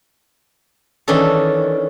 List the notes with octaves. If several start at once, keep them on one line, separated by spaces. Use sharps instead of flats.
D#3 E3 C#4 D4 A4